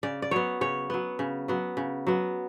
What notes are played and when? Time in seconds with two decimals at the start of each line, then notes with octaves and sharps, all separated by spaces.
0.03 C#3 D5
0.22 D5
0.31 F#3 B3 C#5
0.61 C#3 C#5
0.90 F#3 B3
1.19 C#3
1.48 F#3 B3
1.77 C#3
2.07 F#3 B3